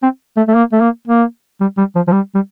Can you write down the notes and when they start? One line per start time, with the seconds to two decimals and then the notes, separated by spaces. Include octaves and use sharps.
0.02 C4
0.37 A3
0.48 A3
0.54 A#3
0.72 A3
0.81 A#3
1.07 A#3
1.61 G3
1.78 G3
1.95 F3
2.07 F3
2.12 G3
2.34 G3